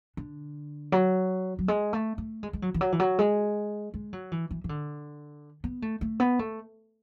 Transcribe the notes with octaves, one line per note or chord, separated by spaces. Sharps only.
D3
F#3
F#3
G#3
A3
A3
G#3
G#3
F#3
E3
F#3
E3
F#3
G#3
G#3
F#3
E3
E3
E3
D3
B3
A3
A3
B3
A3